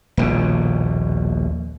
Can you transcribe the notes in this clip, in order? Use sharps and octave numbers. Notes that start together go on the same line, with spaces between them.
D#1 A#1 B2